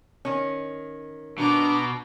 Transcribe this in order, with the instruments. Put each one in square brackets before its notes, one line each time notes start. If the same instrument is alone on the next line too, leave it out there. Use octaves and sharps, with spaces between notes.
[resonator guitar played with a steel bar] D#3 C#4
[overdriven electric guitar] B2 [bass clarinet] D4 [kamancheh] A#5 D6